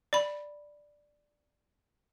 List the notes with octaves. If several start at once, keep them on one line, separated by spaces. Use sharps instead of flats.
D5 B5